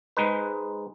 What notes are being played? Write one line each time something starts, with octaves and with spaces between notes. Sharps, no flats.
G#2 G#3 D#4 B4